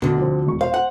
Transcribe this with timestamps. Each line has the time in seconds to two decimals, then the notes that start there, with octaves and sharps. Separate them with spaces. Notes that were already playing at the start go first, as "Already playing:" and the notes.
0.02 D2 B2 D3
0.18 F3 C4
0.47 E1 C#6
0.61 C5 F5
0.74 F#5